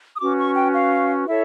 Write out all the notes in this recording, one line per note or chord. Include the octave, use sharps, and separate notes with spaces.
D#6
C#4 F#4 B4 D6
C#6
G5
F5
E4 A4 C#5 E5